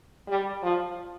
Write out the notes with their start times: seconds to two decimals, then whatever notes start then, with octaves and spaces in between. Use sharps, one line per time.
0.28 G3
0.62 F3